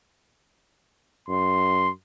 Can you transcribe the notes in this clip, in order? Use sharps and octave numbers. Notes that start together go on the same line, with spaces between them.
F#2 C6